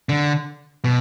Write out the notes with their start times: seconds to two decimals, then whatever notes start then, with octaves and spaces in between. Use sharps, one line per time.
0.09 D3
0.84 B2